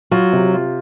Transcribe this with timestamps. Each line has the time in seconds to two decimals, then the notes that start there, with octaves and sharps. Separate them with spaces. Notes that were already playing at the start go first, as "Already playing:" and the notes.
0.11 F#3 F4
0.33 C3
0.54 F4